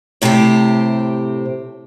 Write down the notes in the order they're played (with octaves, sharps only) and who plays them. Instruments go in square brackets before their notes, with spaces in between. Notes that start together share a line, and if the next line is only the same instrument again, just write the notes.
[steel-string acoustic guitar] A2 C3 A3 C4 G4